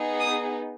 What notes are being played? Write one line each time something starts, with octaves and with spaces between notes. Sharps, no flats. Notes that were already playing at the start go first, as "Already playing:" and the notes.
Already playing: B3 D#4 G#4
D#6